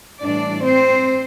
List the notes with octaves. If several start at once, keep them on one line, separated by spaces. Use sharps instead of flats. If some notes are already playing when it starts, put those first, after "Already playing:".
A2 E3 G3 D4 D5
C4 C5